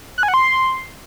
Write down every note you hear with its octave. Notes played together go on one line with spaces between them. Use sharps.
F#6
G#5
F#5
C6